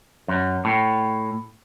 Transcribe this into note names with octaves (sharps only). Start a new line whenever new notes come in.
F#2
A2